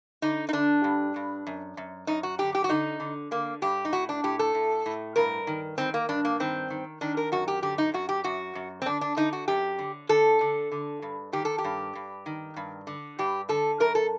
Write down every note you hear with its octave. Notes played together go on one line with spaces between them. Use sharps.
D3 D#4
D#4
D3 D4
G2
G2
F#2
F#2
F#2 D#4
F#4
D3 G4
G4
F#4
D3 D#4
D3
D3 A#3
G2 G4
D#4
A2 F#4
D4
A2 G4
A4
A2
A2
G2 A#4
D#3
D#3 C4
A#3
G2 D4
A#3
D#3 C4
D#3
D#3 D4
A#4
F#2 F#4
G4
D3 G4
D#4
F#2 F#4
G4
F#2 F#4
F#2
C4
D3 D4
D4
D3 D#4
F#4
F#2 G4
D3
D3 A4
D3
D3
G2
D#3 G4
A4
G4
G2
G2
D#3
G2
D3
G2 G4
D3 A4
F#2 A#4
A4